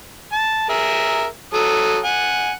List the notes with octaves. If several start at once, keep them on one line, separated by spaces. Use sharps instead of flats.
A5
G#4 A#4 E5
F#3 A4 D#6
F#5 G#5